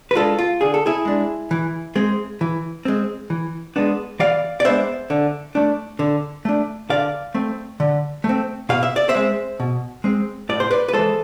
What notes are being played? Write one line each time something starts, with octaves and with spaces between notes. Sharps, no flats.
B4
G#3 D4 F4 A4
F4
D3 G#4
A4
E4 G#4
G#3 D4
E3
G#3 C4
E3
G#3 C4
E3
G#3 B3 D4
E3 D5 F5
D5
G#3 B3 D4 C5 E5
D3
A3 D4
D3
A3 D4
D3 D5 F5
A3 C4
D3
A3
C4
B2 F5
E5
D5
C5 E5
G#3 C4
B2
G#3 C4
A2 D5
C5
B4 D5
B4
E3 G#3 A4 C5